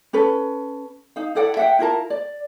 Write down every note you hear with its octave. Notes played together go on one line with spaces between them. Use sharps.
C#4 A4 B4
D#4 F5
E4 A4 D5 F#5
E5 F#5 G5
E4 F4 A#4 A5
D5